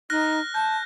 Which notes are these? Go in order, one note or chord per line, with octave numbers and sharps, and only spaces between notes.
D#4 F6 F#6 A#6
A5 G6